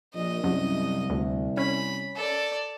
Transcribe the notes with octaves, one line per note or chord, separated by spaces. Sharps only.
A#1 D#5
C2 F#2
D2
C#4 B5
A4 D5